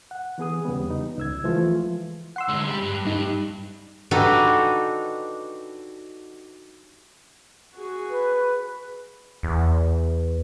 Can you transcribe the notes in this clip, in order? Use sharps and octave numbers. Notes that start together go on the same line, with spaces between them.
F#5
E3 B3 G#4 D#6
E2 C#3 G3 B3
D#4
C#2 E6 G#6
E3 F3 G#3 A3 F4
F#5 C6 E6
D3 G#3
G3
G2
G2 G3 D#4
D4 D#4 F#4 G4 A4 B4
F#4 G#4
B4
E2